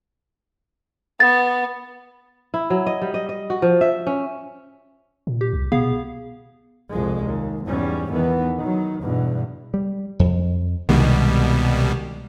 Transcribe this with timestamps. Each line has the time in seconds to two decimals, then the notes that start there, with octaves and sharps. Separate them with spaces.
1.20 B3 A6
2.54 E4
2.70 F#3
2.87 D#5
3.02 G3
3.14 D#5
3.29 D#5
3.50 F#4
3.62 F3
3.81 E5
4.07 C#4
5.27 A#2
5.41 G4
5.53 C2
5.72 B2 B3 G#4 F5
6.91 C2 F2 F3 G#3
7.24 D#2
7.66 E2 G#2 G3 C#4
8.12 E2 D#3 E3 B3
8.59 D#3 F#3
9.01 E2 G2 B2
9.74 G3
10.19 F2
10.89 C2 B2 D#3 G3 G#3